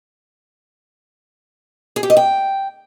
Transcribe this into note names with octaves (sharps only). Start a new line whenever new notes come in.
G#4
G4
D#5
G5